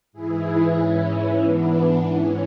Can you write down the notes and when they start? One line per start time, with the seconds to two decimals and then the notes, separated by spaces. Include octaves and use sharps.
0.13 G#2 E3 E4 G#4
0.76 G#2 E3 C#4 E4
1.08 C#4 E4
1.40 G#2 E3 B3 D4
2.04 G#2 E3 C#4